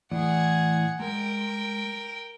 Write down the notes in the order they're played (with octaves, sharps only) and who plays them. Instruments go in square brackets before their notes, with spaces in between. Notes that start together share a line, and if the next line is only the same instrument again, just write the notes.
[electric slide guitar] A2 E3 D5 [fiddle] G#4 F#5
[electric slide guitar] G#3 [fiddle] A#4 G5